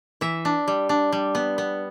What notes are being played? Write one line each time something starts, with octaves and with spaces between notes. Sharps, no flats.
E3 E5
D4
G3
D4
G3
B3
B3